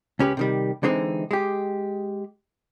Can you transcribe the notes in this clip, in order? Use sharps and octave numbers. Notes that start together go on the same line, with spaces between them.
C#2 C#4 G4 B4
C3 D#3 G3
D3 E3 G#3 C4 D#4
G#3 G4